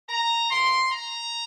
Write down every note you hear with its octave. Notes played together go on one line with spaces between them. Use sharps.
A#5
E3 A#3 E4 C6
A#5